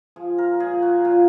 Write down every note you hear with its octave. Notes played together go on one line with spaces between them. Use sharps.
F3 G#4
A#4
A#2 G#4
F#4
A#2 F4